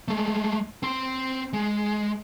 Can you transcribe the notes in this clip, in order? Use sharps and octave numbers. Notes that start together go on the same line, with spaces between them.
G#3 A3
C4 C6
G#3